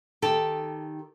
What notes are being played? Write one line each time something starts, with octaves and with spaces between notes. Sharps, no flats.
D#3 G4 A4